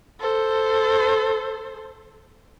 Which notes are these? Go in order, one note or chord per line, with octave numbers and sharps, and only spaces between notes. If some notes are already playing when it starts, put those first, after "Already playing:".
A4 C5